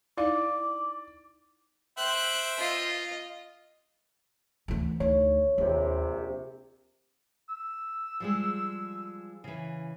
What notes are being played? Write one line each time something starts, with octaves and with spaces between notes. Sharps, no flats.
D#4 E4 D5 F5 D6
C5 E5 G5 F#6
F4 D#5
D2 E3
D2 D#4 C#5
A#1 D#2 C3
E6
F3 G3 G#3
C#3 E3